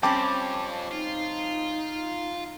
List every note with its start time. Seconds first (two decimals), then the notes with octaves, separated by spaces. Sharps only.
0.03 F2 G3 C4 C#4 G5 A5 D6
0.91 D#4 F4